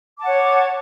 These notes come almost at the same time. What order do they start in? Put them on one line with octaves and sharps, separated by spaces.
D6 A5 F#5 C#5